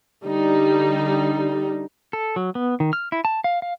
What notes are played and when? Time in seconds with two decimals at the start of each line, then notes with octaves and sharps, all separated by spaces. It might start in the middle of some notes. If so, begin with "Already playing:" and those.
0.24 D3 G3 D#4
2.13 A4
2.36 F#3
2.55 B3
2.80 D#3
2.93 F6
3.12 E4
3.25 A5
3.44 F5
3.62 F5